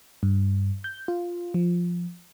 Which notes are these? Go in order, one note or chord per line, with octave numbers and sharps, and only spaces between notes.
G2
G6
F4
F3